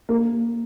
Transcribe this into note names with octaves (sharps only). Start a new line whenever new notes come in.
A#3